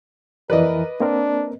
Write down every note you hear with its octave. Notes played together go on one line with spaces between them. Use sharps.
F2 E3 A#4 B4 D5 D#5
A#3 C4 D4 A#4